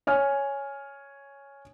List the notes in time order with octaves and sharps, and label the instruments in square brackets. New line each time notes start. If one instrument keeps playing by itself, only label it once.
[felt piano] C#5 G#5 F6